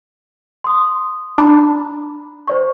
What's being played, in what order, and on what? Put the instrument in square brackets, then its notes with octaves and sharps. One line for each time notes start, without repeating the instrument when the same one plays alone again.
[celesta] C6 D#6
[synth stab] D4 [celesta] A#5 B5
[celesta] C5 D5 C#6